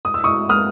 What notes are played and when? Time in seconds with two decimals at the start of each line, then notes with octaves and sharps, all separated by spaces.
0.05 D#6
0.14 E6
0.24 C#6 D#6
0.49 D#6 F6